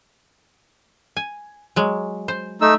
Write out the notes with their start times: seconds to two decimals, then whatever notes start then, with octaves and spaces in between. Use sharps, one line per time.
1.17 G#5
1.76 F#3 G#3
2.28 C5
2.61 A3 D#4 E6